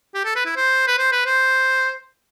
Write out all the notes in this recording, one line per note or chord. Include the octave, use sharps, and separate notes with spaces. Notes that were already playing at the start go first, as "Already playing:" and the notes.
G4
A4
B4
E4
C5
B4
C5
B4
C5